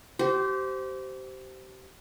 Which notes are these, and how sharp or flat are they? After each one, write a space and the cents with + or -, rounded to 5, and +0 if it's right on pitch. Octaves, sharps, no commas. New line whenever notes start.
G4 -30 C5 -10